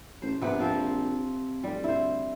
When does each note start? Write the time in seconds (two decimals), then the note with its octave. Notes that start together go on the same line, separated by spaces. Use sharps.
0.22 A1 C5
0.41 A#1 C3 B3 B4
0.59 F3 C4 F4
1.64 F1 G3
1.84 D2 E4 C5